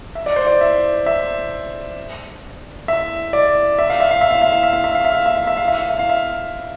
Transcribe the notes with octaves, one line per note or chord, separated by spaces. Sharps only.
E5
D5
C5
D5
E5
E5
E5
D5
E5
F5
E5
F5
E5
F5
E5
F5
E5
F5
E5
F5
E5
F5
E5
F5
E5
F5
E5
F5
E5
F5
E5